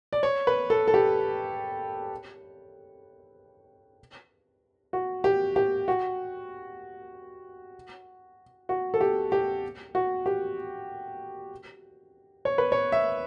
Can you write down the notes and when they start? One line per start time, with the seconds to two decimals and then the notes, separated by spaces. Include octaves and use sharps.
0.13 D5
0.23 C#5
0.47 B4
0.70 A4
0.88 A4
0.94 G4
4.93 F#4
5.24 G4
5.56 G4
5.88 F#4
8.69 F#4
8.94 A4
9.01 G4
9.32 G4
9.95 F#4
10.26 G4
12.45 C#5
12.58 B4
12.72 C#5
12.92 E5